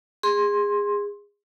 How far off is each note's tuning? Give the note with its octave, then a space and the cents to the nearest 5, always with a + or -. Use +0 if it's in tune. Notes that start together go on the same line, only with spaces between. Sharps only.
G#4 -25 C6 +15